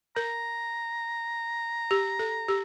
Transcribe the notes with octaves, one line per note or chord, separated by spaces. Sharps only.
A#4 A#5
G4
A4
G4